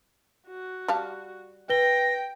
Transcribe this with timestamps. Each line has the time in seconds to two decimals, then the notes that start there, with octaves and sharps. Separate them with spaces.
0.48 F#4
0.88 G3 F5 A5
1.69 B4 G5 A#6 G7